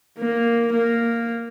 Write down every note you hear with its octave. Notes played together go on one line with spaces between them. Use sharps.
A#3
A#3